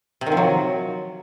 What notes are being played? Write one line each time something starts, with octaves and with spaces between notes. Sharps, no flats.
C3
D#3
F3
F#3